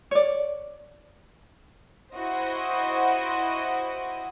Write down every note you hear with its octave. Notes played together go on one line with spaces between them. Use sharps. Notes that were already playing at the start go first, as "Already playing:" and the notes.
C#5 D5
E4 F#4 C5 D#5